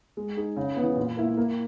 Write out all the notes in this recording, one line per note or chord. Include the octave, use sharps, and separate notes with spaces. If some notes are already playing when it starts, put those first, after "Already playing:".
G#3
D#4 G#4
C#3
E3 B3
A#2
A#3 E4
A#3